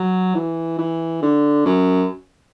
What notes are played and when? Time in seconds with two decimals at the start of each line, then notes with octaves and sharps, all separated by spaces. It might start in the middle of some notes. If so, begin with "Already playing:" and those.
Already playing: F#3
0.35 E3
0.78 E3
1.22 D3
1.66 F#2